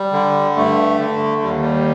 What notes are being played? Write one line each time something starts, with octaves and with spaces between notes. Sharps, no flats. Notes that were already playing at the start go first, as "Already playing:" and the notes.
Already playing: G3
D3
G2 A3
D3
D#2 G3
G3